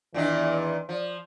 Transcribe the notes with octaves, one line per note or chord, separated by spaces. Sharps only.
E2 A#2 D#3 E3 D4
F3 D5